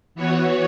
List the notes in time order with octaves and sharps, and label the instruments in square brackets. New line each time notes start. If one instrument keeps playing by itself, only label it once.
[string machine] E3 B3 F#4 C#5